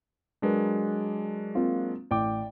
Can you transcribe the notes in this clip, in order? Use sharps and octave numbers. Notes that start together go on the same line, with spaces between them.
F#3 G#3 D4 A#4 B4
A#3 C4 F4
A1 D5 G5 D6